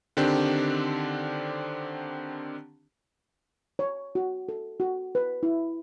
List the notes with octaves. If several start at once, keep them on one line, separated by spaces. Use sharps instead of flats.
D3 D#3 C4 D4 G4
C#5
F#4
A4
F#4
B4
E4